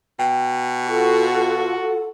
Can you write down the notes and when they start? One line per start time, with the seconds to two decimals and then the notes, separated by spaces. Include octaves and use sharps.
0.19 B2 G5
0.87 F4 F#4 A4 F#5